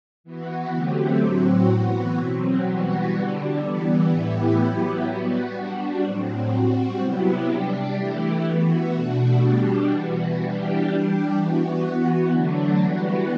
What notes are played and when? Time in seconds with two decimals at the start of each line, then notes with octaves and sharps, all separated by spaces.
0.24 E3 B3 F#4
0.72 D3 F#3 A3 C4 G4
1.20 A2 F#3 C4 F#4
1.69 E3 B3 F#4
2.17 B2 F#3 C4
2.65 E3 G3 B3 F#4
3.13 D3 G3 D4
3.62 E3 G3 B3
4.10 A2 E3 B3 E4 G4
4.58 F#3 B3 E4 G4
5.06 G3 B3 F#4
5.54 G3 D4 F#4
6.03 A2 F#3 C4
6.51 G3 C4 F#4
6.99 C3 F#3 B3 E4 G4
7.48 G3 D4 G4
7.95 E3 A3 E4 G4
8.44 E3 B3 F#4
8.92 B2 A3 D4 F#4
9.41 B2 G3 D4 G4
9.89 E3 B3 F#4
10.37 E3 G3 D4 G4
10.85 G3 D4 G4
11.33 E3 B3 F#4
11.82 E3 B3 F#4
12.30 D3 F#3 A3 D4
12.78 E3 G3 B3 F#4